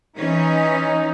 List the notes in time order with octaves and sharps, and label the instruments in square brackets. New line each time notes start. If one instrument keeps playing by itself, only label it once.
[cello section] E3 C#4 [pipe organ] D#4